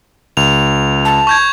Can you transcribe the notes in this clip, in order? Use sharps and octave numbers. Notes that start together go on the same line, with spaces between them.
C#2 F7
A5
C#6 G6 G#6